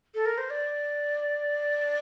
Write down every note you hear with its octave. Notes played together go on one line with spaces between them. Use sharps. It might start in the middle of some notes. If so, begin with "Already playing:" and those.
A4
A#4
C5
D5